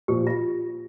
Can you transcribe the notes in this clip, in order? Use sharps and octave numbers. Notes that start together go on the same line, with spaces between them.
A#2 F3 G4
F4